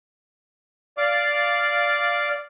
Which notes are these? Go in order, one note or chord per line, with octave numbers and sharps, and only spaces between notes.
D5 F5 D6